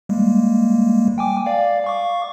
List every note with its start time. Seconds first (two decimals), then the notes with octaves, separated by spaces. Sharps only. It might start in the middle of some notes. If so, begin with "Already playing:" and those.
0.09 G3 G#3 A#3
1.18 G5 G#5 D6
1.46 D5 F5
1.84 F5 C#6 D6